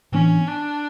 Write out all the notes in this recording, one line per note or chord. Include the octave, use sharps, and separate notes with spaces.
A2 E3 B3 C#4 D4
D4